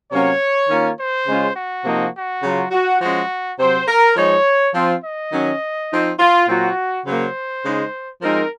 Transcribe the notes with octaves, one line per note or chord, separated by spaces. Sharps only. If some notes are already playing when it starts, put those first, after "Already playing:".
C3 F#3 A#3 C#4 C#5
D#3 A#3 C#4 F4
C5
C#3 G#3 C#4 F4
F#4
C3 F3 A#3 D#4
F#4
C#3 F#3 C#4 F4
F#4
F3 G#3 C#4 F#4
C3 F#3 C4 C5
A#4
F3 G#3 D#4 C#5
F3 C4 F4
D#5
D#3 F#3 C#4
F3 C4 D#4
F4
A#2 F#3 C4 F4 F#4
C#3 F#3 A#3 C5
C#3 G#3 D#4
F3 G#3 C4 D#4 A#4